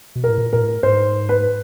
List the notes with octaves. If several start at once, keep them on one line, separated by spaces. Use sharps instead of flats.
B2
A#4
A2
A#2
A#2 A#4
A2
G#2 C5
B4